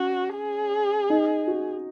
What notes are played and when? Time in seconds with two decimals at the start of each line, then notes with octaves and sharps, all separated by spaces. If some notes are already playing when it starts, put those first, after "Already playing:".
Already playing: C#4 F#4
0.35 G#4
1.10 D#4
1.47 F#4